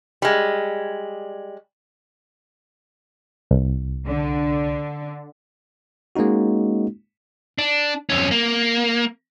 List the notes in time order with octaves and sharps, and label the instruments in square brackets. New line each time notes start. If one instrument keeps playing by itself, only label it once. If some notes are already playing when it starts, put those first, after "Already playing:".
[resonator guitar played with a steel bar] G3 G#3
[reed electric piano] C2
[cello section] D3
[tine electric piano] G#3 A#3 C#4 D#4 F#4
[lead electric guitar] D4
F2 C#4
A#3